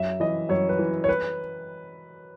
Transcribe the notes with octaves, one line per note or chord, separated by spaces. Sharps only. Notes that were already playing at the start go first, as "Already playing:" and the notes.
Already playing: F#2 E5
E3 D#5
F#2 C#5
B4
E3
C#5
B4